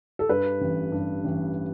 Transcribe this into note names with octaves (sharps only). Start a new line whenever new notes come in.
A4
G2 B4
A1
G2
A1